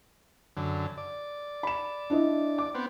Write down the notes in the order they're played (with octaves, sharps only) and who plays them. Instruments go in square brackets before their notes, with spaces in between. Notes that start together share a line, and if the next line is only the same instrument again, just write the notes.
[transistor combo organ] F#2 D3
D5
[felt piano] B5 E7
D4 E4 D#5
D6
[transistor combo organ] B3 C4